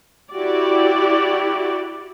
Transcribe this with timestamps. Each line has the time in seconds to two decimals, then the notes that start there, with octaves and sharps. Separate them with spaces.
0.33 E4 F#4 G4 D5